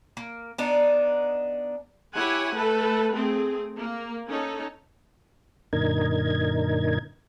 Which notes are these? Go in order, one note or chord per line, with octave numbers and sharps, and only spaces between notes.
A#3
B3 D4 D#4
E4 G4 C#5 F#5 G#5
A3 A4 B4
A3 C4 G#4
A#3
C#4 D#4 A4
F#2 A#2 D3 D#4 A#4 G#6